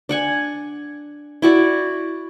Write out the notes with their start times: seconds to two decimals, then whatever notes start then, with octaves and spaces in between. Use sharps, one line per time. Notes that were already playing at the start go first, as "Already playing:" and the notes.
0.09 D4 F#5 G#5
1.42 E4 F#4 D5